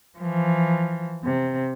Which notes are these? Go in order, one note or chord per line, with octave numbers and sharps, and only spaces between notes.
E3 F3
C3